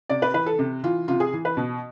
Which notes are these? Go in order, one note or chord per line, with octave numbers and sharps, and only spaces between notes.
C3 D5
B4
E3 B4
A4
C3
E3 F4
C3 F4
G#4
E3
B4
B2